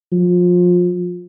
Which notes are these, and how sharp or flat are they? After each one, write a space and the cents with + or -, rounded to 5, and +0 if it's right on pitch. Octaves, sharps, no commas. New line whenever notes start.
F3 +25